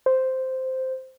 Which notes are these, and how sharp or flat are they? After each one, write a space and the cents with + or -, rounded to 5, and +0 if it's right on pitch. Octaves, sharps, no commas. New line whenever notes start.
C5 -5